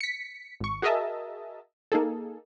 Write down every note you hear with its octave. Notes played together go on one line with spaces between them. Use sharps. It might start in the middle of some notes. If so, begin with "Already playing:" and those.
B6 C#7
G#1 C#6
F#4 G#4 A#4 D#5 E5 A5
A#3 D#4 G#4 A4